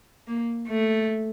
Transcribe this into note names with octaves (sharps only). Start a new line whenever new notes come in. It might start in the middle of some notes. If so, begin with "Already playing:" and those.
A#3
A3